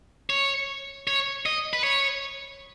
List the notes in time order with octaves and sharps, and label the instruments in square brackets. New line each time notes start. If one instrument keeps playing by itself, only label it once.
[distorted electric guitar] C#5
C#5
D#5
B4
C#5